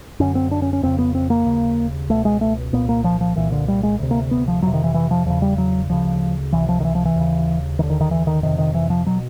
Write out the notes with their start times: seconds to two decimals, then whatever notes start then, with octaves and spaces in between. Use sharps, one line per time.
0.20 F#2 D3 C#4
0.35 C4
0.51 D4
0.62 C#4
0.73 C#4
0.83 F2 C#3 C4
0.99 B3
1.15 C4
1.30 A#3
1.46 D#2 C#3
2.09 C#2 B2 A3
2.25 G#3
2.41 A3
2.73 C2 A#2 B3
2.89 A#3
3.04 F3
3.21 F3
3.36 C2 A#2 E3
3.52 D3
3.68 G3
3.83 G#3
3.99 D2 C3
4.11 A#3
4.31 B3
4.48 F3
4.62 F2 C3 F#3
4.74 D#3
4.84 E3
4.94 E3
5.11 F3
5.26 E2 C#3 F3
5.42 G3
5.58 F#3
5.89 D2 C#3 F3
6.53 C#2 C3 E3
6.69 F3
6.80 D#3
6.85 E3
6.95 F3
7.05 E3
7.16 D#2 C#3
7.79 D#2 D3 D#3
7.90 D#3
8.01 D#3
8.11 E3
8.27 D#3
8.43 F2 C3 D#3
8.58 D#3
8.75 E3
8.90 F3
9.07 B2 F#3